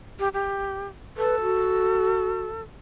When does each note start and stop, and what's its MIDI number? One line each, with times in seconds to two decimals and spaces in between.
0.19 0.28 67
0.34 0.87 67
1.17 2.61 69
1.17 1.40 71
1.42 2.43 66